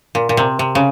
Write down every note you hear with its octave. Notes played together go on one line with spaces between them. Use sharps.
A#2
A#2
C3
C3
C#3